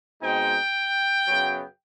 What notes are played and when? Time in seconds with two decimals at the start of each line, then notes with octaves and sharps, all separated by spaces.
0.22 B2 G#3 C4 D#4 G5
1.27 F#2 C#3 F#3 B3